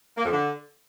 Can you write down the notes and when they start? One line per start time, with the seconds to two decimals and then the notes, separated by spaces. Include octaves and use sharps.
0.17 A#3
0.25 F2
0.32 D3